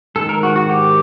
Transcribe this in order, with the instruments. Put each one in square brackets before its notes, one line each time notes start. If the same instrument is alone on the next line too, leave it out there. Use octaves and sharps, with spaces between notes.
[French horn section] G#2 D#3 G#3 [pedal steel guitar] A4
[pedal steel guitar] A#4
F#4
F#4
G4